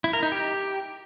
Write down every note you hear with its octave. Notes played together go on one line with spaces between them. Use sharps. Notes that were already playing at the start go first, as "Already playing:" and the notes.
E4
A#4
D#4
G4